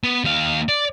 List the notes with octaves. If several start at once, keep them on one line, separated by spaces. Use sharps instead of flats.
B3
D#2 F5
D5